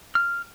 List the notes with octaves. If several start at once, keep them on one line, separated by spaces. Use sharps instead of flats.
F6